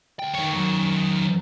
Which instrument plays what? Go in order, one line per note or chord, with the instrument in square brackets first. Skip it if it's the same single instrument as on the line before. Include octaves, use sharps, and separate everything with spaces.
[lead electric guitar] D2 G5
[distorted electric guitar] D#3 C#5
[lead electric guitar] F#2